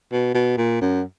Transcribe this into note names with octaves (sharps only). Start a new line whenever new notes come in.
B2
B2
A#2
F#2